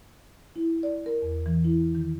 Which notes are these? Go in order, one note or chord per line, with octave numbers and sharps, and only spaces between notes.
E4
D5
A#4
E2
E3
E4
D#3